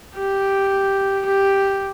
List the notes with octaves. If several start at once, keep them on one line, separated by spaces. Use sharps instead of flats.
G4
G4